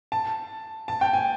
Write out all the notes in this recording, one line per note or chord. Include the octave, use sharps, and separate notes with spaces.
A5
A5
G5
G#5